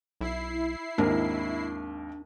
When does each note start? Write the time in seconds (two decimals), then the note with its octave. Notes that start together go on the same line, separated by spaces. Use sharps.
0.21 B1 E4 C7
0.98 G#1 D#2 D4 A#4